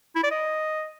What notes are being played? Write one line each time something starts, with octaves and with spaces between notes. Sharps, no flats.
E4
D5
D#5